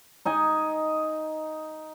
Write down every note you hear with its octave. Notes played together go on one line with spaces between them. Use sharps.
D#4 D#5 G#5